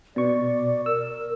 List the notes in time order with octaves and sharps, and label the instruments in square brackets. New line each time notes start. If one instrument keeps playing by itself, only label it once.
[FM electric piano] B2 C#6 [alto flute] D5
[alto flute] A#4 [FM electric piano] E6